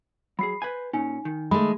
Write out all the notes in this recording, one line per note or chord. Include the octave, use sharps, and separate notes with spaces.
F#3 G#4 B5 C7
B4 C5 G#5
A#2 C#4 D#4 G#5
D#3
G#3 A3 B5